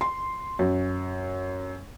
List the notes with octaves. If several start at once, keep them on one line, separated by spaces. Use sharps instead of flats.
C6
F#2